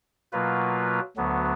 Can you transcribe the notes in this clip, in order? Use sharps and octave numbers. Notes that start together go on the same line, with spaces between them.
B2 F#3 A#3 F4 B4
D2 D3 F#3 B3